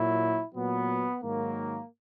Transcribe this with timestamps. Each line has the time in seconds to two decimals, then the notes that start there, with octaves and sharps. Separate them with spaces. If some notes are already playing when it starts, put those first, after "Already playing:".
Already playing: A#2 F#3 E4
0.53 A#2 F#3 B3
1.23 G#2 D#3 F#3 A#3